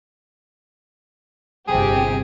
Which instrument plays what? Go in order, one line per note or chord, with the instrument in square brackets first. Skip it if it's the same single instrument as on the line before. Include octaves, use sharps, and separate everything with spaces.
[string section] G1 C3 G4 [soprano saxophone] G#4